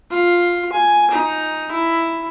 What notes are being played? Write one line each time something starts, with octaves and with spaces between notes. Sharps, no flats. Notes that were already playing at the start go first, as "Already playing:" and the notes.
F4
G#5
D#4
E4